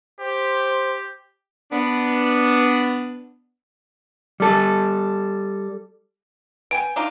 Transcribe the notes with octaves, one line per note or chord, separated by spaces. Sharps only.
G4 C5
B3 D4
G3 A4
B3 G5 G#5 D7
D4 D#4 F4